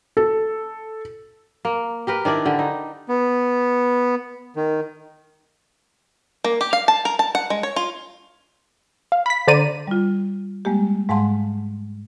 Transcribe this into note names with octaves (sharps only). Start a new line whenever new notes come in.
A4
A#3
G4 A#4 B4
D#3 D4 E4 D5
D3 G4
D#4
B3
D#3
A#3
G4
F5
A5
A#4
A5
F#5
G#3
C#5
F4
F5
B5 B6
D3 C5 D5 A#5 D#7
G3 F4
G3 G#3 A#3 G4
G#2 G#3 F5 F#5 A5 C6